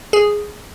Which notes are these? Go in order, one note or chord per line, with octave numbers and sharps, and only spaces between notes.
G#4